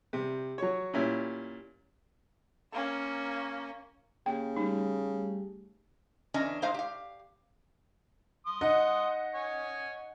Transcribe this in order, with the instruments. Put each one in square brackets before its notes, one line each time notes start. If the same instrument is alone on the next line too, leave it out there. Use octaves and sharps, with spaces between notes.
[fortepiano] C3 G3
F#3 C#5
A#2 G3 C#4 E4
[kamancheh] A#3 C#4
[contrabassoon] C#3 [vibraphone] A#3 G4 [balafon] G5
[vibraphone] G3 A3 G4 [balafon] D#4
[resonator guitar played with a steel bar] E2 C#4 D4 D#5 A#5
A2 G#3 D#4 C5 F5 A#5
G4 F5
[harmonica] C6 D#6
[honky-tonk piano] D#4 F#5 [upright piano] D#5
[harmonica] C#5 G#5